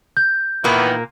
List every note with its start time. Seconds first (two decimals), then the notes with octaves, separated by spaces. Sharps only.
0.17 G6
0.64 A#2 D#3 E3 A#3 B3